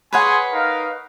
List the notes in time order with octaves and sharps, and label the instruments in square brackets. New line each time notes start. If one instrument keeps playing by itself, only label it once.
[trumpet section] G#4 G#5 C6 [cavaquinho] B4 C#5 F#5
[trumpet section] D#4 A#4 F5